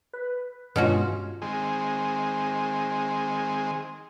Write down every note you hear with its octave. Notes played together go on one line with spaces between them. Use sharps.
B4
G2 B2 G#3 C#4 F4 F#4
D#3 G#3 C4 G#4